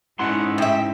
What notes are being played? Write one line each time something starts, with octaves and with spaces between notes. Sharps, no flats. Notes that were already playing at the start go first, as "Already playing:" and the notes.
G#2 C#4 D#4 E4 F#5 C6
A2 E5 G5